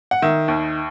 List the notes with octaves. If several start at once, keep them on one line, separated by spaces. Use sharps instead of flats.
F#5
D#3 E5
D#2